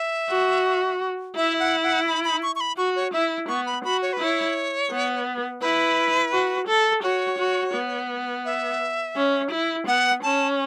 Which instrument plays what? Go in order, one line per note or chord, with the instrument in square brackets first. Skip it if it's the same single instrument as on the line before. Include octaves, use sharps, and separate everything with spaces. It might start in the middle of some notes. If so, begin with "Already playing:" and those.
Already playing: [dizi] E5
[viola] F#4
[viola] E4 [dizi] E5
[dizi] F#5
F#5
B5
B5
C#6
C#6
B5
[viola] F#4 [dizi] C#6
[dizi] C#5
[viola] E4 [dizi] E5
[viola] B3 [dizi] C#6
[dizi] B5
[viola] F#4 [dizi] B5
[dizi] C#5
B4
[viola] E4 [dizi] C#5
[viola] B3
[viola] E4 [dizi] B4
[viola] F#4
A4
[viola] F#4 [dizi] C#5
[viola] F#4
B3
[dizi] E5
[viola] C#4
E4
[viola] B3 [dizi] F#5
[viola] C#4 [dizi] A5